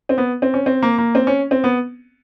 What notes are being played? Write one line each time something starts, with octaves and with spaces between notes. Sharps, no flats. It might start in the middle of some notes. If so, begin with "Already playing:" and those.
C4
B3
C4
C#4
C4
A#3
A#3
C4
C#4
C4
B3